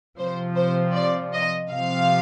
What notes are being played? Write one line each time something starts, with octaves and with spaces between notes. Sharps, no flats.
C3 F3 C5
C5
D5
D#5
C3 F3 F5